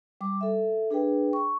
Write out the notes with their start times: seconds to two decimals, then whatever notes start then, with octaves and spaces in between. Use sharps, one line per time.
0.21 G3 D6
0.41 A4 E5
0.90 D4 G#4 B4 G5
1.33 C#6